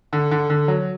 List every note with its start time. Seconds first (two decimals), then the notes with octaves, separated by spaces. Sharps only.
0.13 D3
0.31 D3
0.50 D3
0.68 F#3